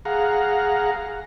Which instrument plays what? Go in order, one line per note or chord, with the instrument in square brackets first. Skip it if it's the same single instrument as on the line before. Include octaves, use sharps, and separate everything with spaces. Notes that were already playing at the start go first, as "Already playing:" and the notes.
[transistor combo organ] G#4 F5 F#5 A#5